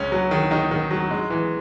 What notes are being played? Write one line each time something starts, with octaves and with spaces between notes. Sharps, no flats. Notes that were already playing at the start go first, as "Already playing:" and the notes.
Already playing: C#2 C#4
F#3
D#3
D#3 D#4
D#3
F#3
G#3
E3